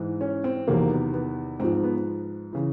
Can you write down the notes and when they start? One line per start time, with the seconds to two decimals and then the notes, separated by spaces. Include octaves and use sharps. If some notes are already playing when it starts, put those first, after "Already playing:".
Already playing: G#2 E3
0.21 C#4
0.44 C4
0.68 E2 C3 D#3 F#3 A#3
0.91 B3
1.14 B3
1.60 G#2 F3 C4
1.83 B3
2.53 C#3 E3